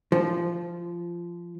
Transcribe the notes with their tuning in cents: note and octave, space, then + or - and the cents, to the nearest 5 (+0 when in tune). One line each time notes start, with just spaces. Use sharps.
F3 -15